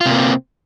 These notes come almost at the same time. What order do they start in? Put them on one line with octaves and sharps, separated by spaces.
F4 C3 A#3 C4